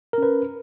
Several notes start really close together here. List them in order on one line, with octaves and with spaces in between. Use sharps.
A#4 C#4 B4